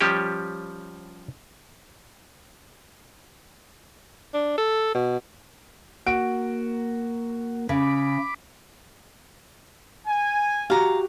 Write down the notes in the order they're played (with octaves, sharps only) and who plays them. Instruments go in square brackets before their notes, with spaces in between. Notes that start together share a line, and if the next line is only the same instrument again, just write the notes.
[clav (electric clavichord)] F3 G3 C#4 G4
[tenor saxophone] D4
A4
B2
[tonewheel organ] A#3 [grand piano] F#4 D7
[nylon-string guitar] C#3 [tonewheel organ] B5 D6
[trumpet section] G#5
[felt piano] F#4 G4 [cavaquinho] F5 A#5